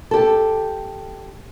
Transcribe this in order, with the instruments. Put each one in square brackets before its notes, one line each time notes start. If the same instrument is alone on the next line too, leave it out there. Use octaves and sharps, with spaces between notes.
[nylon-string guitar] G4 A4